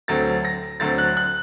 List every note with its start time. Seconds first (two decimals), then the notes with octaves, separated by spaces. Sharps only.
0.08 D2 D3 F#3 C4 A6
0.45 A#6
0.80 D2 D3 F#3 C4 A6
0.98 F#6
1.17 F#6